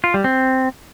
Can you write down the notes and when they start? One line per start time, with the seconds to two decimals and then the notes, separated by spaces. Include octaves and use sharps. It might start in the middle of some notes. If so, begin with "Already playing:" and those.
0.04 F4
0.14 G3
0.24 C4